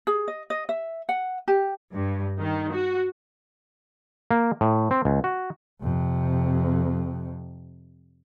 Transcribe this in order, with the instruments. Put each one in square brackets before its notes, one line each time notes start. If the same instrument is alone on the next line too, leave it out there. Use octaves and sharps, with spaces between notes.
[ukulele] G#4
D#5
D#5
E5
F#5
G4
[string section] G2
D#3
F#4
[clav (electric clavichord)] A#3
A2
C4
C#2
F#4
[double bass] F2 C3